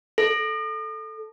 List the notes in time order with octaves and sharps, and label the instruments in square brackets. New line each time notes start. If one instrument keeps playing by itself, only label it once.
[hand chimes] A4